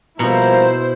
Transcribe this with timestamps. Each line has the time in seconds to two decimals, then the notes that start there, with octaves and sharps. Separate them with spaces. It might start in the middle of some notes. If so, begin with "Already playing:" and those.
0.19 B2 F3 G3 A#3 E4 C5 A#5